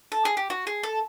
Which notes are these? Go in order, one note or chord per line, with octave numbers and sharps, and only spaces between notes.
A4
G#4
G4
F#4
G#4
A4